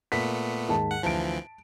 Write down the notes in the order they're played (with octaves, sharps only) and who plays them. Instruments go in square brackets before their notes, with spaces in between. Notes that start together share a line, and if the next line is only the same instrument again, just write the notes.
[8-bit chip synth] A#2 A3 B3 [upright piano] B6
[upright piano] D#2 G#2 A5
[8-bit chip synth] F#5
[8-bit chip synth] D2 E3 F3 [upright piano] A5 D7